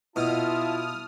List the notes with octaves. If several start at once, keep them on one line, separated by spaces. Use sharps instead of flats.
B2 E4 F4 A5 D#6 F6